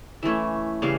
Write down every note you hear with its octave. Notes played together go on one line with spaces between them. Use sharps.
E3 A3 C#4 E5
C#3 E3 G3 F5